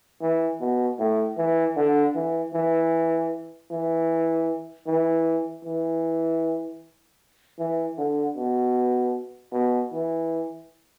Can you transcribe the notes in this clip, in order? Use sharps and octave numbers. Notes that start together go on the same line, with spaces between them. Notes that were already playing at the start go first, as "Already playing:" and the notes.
E3
B2
A2
E3
D3
E3
E3
E3
E3
E3
E3
D3
B2
B2
E3